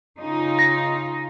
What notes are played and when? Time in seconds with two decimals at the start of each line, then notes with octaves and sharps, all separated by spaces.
0.19 C#3 D#4 F4
0.59 A#6